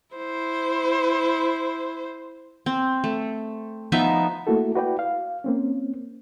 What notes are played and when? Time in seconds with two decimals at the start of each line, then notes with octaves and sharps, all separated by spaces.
0.15 E4 C5
2.66 C4
3.04 A3
3.92 F3 B3 D#4 E5
4.47 A3 A#3 E4 F#4 A4
4.74 E4 F#4 B4 D5 G5
4.99 F5
5.44 A#3 C4 C#4